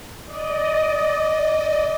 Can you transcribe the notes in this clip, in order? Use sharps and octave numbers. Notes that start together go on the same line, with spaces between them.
D5 D#5